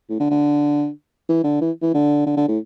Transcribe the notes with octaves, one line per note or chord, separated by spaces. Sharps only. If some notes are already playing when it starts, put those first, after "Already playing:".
A2
D3
D3
E3
D3
E3
E3
D3
D3
D3
A2